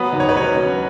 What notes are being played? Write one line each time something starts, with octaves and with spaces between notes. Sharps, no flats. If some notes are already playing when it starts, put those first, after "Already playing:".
Already playing: F#3 B3 B4
D#2
C#5
B4
F#3 C#4 C#5
F#3